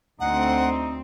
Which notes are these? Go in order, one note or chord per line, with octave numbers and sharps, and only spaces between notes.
D2 C4 D#4 F#5